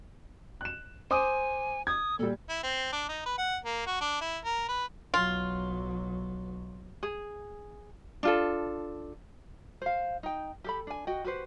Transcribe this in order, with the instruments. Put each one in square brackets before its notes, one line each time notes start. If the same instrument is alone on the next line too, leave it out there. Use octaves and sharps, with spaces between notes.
[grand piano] F#6 E7
[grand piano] C5 D6 D#6 [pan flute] G#5
[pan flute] D#6 [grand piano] G#6
[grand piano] A#2 G3 [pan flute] A4
[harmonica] E4
C4
D4
D#4
B4
F#5
A#3
F#4
D4
E4
A#4
B4
[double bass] B1 F#3 [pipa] F4
[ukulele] G#4
D4 F4 A4
C5 F5
D#4 G5
G4 A4 B5
D4 G#5
F#4 D#5 G5
F#4 G4 B4 C5